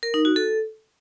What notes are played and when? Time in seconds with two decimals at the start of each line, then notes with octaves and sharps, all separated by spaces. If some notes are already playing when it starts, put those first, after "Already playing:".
0.03 A#4
0.14 D#4
0.25 F#4
0.36 A4